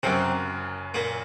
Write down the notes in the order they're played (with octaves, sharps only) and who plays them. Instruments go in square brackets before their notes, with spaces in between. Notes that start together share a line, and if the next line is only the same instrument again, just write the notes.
[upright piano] F#1 F#2 F#3 [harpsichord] C3 C4
[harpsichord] A#2 A#3